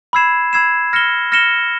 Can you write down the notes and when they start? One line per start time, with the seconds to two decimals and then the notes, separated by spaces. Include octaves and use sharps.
0.13 B5 E6 G#6 C7 E7
0.53 B5 E6 G#6 C7 E7
0.93 F6 A#6 C#7 E7 G7
1.32 F6 A#6 C#7 E7 G7